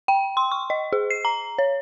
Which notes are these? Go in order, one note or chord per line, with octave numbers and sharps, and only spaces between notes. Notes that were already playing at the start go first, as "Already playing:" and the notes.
G5
C6
C#6
D#5
G#4
C7
A#5
C#5